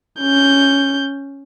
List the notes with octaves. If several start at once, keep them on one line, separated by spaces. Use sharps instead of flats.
C#4 G6